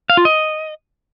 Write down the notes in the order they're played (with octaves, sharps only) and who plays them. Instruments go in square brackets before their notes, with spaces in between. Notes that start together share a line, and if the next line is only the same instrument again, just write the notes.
[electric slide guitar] F5
F4
D#5